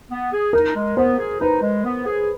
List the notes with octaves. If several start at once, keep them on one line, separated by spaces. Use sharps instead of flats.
B3
G#4
D#4 A#4
G#3
B3 C5
G#4
D#4 B4
G#3
B3
G#4